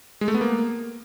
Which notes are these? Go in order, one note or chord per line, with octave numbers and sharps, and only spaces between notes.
G#3
A3
B3
A#3